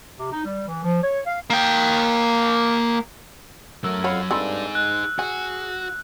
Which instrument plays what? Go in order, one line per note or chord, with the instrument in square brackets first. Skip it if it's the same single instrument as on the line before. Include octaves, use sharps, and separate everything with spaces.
[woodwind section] C3
D#4
G3
E3
F3
C#5
F5
[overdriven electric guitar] A#3 G5
[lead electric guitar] F#2 F#3 [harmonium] A3 A#4 [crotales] E6
[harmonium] F2 F5 F#5 [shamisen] C#5 B5
[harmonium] G2 D4 [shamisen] C4 A4 B5 [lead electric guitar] D#4 G#4
[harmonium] G#3 [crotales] F#6
[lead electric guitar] F#4 [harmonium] G#4 [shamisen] G#5